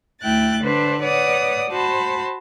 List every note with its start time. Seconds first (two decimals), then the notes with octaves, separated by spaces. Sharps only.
0.22 D2 A3 E4 G5 F#6 A6
0.61 D3 D4 B4 C5
1.02 B4 C#5 D5 F#5 D#6
1.71 F#4 C5 A5 B5